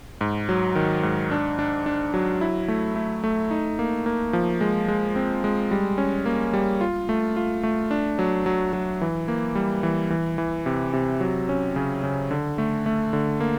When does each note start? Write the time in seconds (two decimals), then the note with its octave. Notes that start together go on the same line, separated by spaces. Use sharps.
0.21 G#2
0.49 F#3
0.76 D#3
1.03 G#2
1.31 D4
1.59 D4
1.86 D4
2.14 F#3
2.41 E4
2.68 A3
2.96 A3
3.24 A3
3.51 D#4
3.79 A#3
4.06 A#3
4.33 F3
4.61 G#3
4.88 G#3
5.16 C4
5.44 G#3
5.71 G3
5.98 C#4
6.26 A#3
6.54 G3
6.81 F4
7.09 A3
7.36 F4
7.63 A3
7.91 D4
8.19 F#3
8.46 F#3
8.73 F#3
9.01 E3
9.28 A#3
9.55 G3
9.83 E3
10.10 E3
10.38 E3
10.66 C3
10.93 C3
11.20 F#3
11.49 C#4
11.76 C#3
12.03 C#3
12.31 D3
12.58 A3
12.86 A3
13.13 D3
13.40 A#3